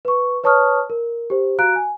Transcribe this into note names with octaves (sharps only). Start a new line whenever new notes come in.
B4 C#6
B4 C#5 A5 C#6 D#6 F6
A#4
G4 C5
F#4 F5 A#5 F#6 D7
G#5